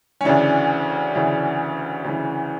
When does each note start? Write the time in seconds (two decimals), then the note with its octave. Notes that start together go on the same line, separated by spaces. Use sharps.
0.21 C#4
0.24 D2 C#3 E3 D4
1.15 D2 C#3 E3
2.04 D2 C#3 E3